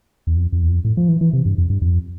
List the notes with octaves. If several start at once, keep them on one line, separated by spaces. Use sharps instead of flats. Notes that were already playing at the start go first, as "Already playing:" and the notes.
E2
F2
F2
E2
F2
A2
F3
E3
E3
C3
G2
F2
G2
F2